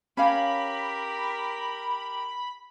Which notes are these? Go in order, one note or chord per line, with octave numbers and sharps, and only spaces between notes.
C#4 G4 A#4 C#5 F5 B5